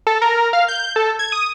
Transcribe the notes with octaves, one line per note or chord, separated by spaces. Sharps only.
A4
A#4
F5
G6
A4
G#6
D#6